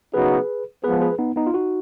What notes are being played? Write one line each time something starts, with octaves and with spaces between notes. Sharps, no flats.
C#3 F#3 B3 D#4 F#4 G#4 B4
F3 G#3 B3 G#4 B4
G#4 B4
B3 D#4
B3 D#4
F4
D#4 F#4